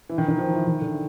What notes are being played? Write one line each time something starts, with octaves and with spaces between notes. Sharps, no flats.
E3
D#3
D#3
F3
E3
D#3
D3